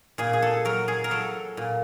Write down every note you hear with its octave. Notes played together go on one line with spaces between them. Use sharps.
A#2 G#4
G#4
A4
F#3 A#4
G#4
A#4
F#3 A4
A#2